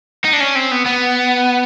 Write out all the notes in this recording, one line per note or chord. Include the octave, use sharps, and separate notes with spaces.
D#4
D4
C#4
C4
B3
B3